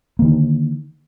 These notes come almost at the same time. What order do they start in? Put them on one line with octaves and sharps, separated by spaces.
A#3 D3 D#3